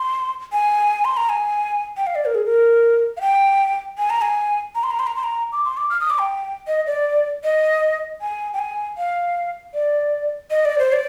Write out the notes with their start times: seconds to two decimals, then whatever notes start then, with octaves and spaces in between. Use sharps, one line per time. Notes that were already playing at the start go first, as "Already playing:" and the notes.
Already playing: C6
0.53 G#5
1.05 C6
1.17 A#5
1.29 G#5
1.97 G5
2.07 F5
2.15 D5
2.25 A#4
2.35 G#4
2.45 A#4
3.17 F5
3.21 G5
3.98 G#5
4.10 A#5
4.22 G#5
4.75 A#5
4.83 C6
4.91 A#5
4.99 C6
5.07 A#5
5.16 C6
5.24 A#5
5.52 D6
5.65 C6
5.77 D6
5.90 F6
6.01 D#6
6.10 D6
6.20 G5
6.67 D#5
6.87 D5
7.44 D#5
8.21 G#5
8.54 G5
8.59 G#5
8.98 F5
9.74 D5
10.51 D#5
10.65 D5
10.79 C5
10.93 D5